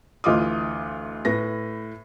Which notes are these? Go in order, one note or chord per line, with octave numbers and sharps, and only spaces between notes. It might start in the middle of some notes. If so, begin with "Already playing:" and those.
D2 E3 F4 D#5 D6 D#6
A2 B4 A#6